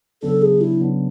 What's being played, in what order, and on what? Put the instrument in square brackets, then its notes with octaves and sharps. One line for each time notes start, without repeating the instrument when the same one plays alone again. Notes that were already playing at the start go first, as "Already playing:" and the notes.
[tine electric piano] C#3 F#3 B3 D4 [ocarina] A4
[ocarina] G#4
E4
[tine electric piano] C#3 F#3 B3 D4